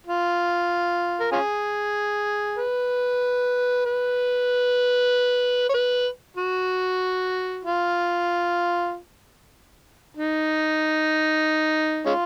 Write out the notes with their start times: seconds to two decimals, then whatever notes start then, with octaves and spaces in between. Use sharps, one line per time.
0.07 F4
1.20 A#4
1.32 C#4 F4 G#4
2.58 B4
3.86 B4
5.69 C#5
5.74 B4
6.37 F#4
7.64 F4
10.17 D#4
12.06 G#3 C#4 F4